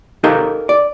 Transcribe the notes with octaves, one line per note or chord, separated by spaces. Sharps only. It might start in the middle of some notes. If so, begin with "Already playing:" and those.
D#4 G4 A4 A#4 D#5 F5
D5